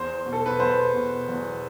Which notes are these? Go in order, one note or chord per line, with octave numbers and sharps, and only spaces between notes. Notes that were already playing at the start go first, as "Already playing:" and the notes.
Already playing: E2 C5
B2
A4
B4
E2 C5
B2
E2